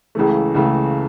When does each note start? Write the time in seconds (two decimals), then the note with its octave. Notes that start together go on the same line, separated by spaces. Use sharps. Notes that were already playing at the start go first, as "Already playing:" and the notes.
0.15 C#2 C#3 E3 A3
0.54 C#2 C#3 E3 A3